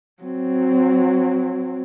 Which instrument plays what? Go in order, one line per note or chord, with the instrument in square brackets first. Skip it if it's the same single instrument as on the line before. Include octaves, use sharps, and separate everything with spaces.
[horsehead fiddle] F#3 C4